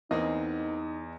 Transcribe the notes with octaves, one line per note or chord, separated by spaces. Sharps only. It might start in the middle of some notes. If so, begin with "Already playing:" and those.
E2 E3 A#3 C4 D#4 D#5